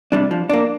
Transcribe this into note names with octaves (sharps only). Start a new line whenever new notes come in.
C3 G3 D4
F3
A#3 D4